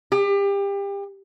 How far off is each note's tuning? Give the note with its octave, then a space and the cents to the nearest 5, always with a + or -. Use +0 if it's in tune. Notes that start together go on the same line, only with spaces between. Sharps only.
G4 +30